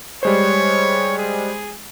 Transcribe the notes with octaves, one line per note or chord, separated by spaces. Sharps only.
G3 G#3 C5 C#5
G#4